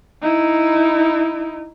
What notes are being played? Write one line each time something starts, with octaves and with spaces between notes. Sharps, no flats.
D#4 E4